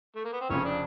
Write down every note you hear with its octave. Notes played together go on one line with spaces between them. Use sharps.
A3
A#3
B3
C4
F1 F2 C#3 C#4
D4